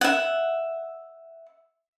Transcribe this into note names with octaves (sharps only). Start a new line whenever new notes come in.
E5 F#5